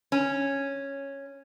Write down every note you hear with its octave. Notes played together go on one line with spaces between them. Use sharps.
C#4